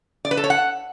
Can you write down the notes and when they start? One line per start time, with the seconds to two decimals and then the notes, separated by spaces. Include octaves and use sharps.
0.25 D5
0.31 B4
0.37 A4
0.44 C#5
0.50 F#5